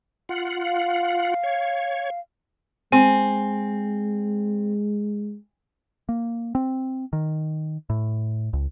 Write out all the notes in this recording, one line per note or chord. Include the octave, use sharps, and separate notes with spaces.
F4 F#5
F5
C#5
G#3 C4 G#5
A#3
C4
D#3
A2
C#2